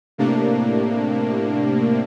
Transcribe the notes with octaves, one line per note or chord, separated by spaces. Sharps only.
A2 C3 A#3 D4